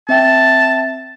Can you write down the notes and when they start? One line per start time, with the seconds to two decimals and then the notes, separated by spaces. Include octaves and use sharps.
0.09 C4 E5 G5 A5